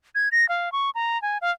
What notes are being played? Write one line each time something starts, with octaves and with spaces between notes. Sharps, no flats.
G#6
A#6
F5
C#6
A#5
G#5
F5